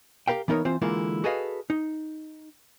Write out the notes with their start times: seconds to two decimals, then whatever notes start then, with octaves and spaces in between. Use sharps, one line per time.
0.28 G4 A#4 B4 F5 G5
0.48 E3 B3 D#4 A#4 C#5
0.65 E3 C4 F4 C5
0.82 D3 E3 G#3 A#3 E4 F4
1.24 F#4 G#4 A4 B4 D#5 F5
1.70 D#4